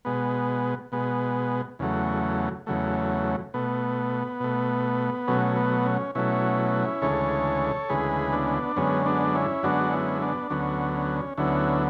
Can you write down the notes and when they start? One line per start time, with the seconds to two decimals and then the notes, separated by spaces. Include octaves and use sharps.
0.05 B2 G#3 B3
0.92 B2 G#3 B3
1.79 E2 C#3 F#3 A3
2.66 E2 C#3 F#3 A3
3.54 B2 A3 B3
4.40 B2 A3
5.28 B2 F#3 A3 C#4
5.56 B3
5.85 C#4
6.15 B2 F#3 A3 C#4 E4
7.02 D2 C#3 E3 G#3 A4 C#5
7.89 D2 C#3 E3 G#3 G#4 B4
8.33 B3 D4
8.76 F#2 D3 G#3 B3 C#4
9.06 B3 D4
9.35 C#4 E4
9.63 F#2 D3 G#3 B3 D4 F#4
9.92 C#4 E4
10.22 B3 D4
10.50 D2 D3 F#3 B3 C#4
10.94 C#4
11.37 D2 D3 F#3 B3 C#4 E4